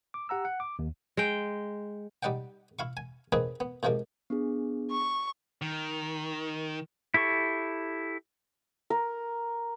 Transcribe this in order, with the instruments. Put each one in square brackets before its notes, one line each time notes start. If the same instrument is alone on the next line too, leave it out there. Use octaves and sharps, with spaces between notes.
[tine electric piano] D6
G4 F#5 A#5 E6
F#5
D6
D#2
[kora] G#3 G5
[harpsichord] G3 D#4 D5 F#5 G5
E4 F5 C#6
G#5
A#3 C4 D#4 G#4 B4
B3
A2 C3 F3 G#3 A#3
[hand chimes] B3 D4 G#4
[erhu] C#6
[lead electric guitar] D#3
[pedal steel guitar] E4 G4 A4 C#6
[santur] A#4